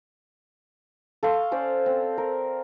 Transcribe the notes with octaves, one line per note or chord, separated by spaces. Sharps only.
A4 F5 C6 C#6
C#4 C5 D5
C4
A#4